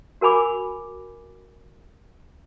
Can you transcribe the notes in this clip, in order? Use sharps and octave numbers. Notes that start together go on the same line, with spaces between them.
F#4 A#4 G#5 B5 D6